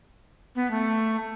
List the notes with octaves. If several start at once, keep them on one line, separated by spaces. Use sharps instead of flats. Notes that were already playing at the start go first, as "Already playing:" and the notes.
B3
A3